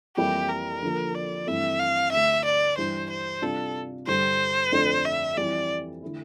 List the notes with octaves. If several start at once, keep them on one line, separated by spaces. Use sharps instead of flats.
F2 E3 G3 A#3 E4 G4
A#4
D3 F3 A#3
D5
G2 E3 A3 C4 E4 E5
F5
D2 D3 A3 E5
D5
G2 E3 G3 D4 C5
C5
C3 G3 D4 F4 A4
G2 D3 G3 C5
F2 D3 A3 D4
E5
F2 E3 G3 C4 D5
D3 A3 E4